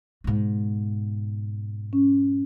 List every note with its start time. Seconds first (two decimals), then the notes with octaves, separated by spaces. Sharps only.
0.24 G#2 B2
1.93 C#4